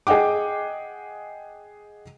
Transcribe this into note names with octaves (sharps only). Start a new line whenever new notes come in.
G#4 D#5 F#5 G5 D6